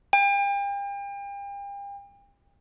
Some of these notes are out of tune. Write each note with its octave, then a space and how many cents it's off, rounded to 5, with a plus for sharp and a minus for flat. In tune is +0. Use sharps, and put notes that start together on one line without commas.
G5 +40